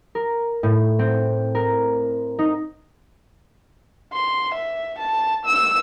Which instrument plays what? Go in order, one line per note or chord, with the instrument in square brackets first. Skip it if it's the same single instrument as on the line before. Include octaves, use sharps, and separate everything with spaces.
[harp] A#4
A2
C4
A#4
D#4
[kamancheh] C6
E5
A5
E6